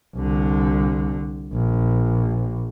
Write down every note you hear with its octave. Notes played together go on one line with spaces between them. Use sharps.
C2 D3
A#1